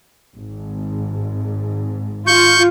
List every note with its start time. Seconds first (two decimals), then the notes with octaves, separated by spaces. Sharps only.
0.35 G#1 G#2
2.27 F4 C#6 G6